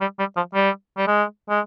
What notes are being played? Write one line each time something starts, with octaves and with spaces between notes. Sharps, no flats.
G3
G3
F3
G3
G3
G#3
G#3